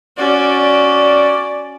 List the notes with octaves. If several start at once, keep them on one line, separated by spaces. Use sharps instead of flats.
C#4 F#4 D5